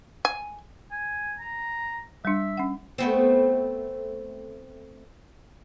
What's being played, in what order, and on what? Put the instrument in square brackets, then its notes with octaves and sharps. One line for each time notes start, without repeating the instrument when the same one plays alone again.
[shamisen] G#5
[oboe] G#5
A#5
[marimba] G3 D4 [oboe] E5
[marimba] C#4 F#5
[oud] A3 B3 C4